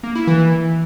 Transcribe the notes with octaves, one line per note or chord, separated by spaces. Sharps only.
A#3
E4
E3